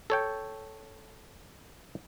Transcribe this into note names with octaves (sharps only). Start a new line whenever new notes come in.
A4 C#5 G5